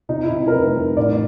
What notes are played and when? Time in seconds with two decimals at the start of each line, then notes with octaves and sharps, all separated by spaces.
0.09 C3 D#4
0.24 E4
0.31 C3
0.47 A#4
0.52 F1 B4
0.75 F1
0.96 A1 D5